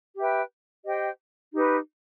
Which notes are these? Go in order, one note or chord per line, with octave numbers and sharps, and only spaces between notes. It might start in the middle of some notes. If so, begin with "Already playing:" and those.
G4 B4 E5 G5
G4 C5 D#5 G5
D#4 G4 B4